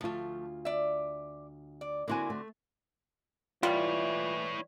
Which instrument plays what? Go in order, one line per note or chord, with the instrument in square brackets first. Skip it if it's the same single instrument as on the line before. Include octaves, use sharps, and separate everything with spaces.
[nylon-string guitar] D2 F4 [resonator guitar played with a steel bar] F3 A3
[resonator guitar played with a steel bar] D5 E5
D5
[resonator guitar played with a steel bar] D3 C4 F#4 [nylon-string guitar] A#3 E4 G#5
[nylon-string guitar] A3
[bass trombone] E3 [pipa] G3 [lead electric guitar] E4 C#5 [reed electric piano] F4